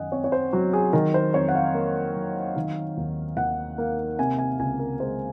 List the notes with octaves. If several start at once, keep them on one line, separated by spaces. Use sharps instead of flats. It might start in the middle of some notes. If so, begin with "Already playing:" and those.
Already playing: F#2 D#3 D#5 F#5 G#5
C4 C#5
C#5
C5
F#3 F#4
G#4
D#3 A#4
C5
F2 C#5
F#5
F5
A#3
F#3
D#3
D#2
D#2 F#5
A#3
C3 G#5
G#5
C#2 G#5
A#4
G#3 C5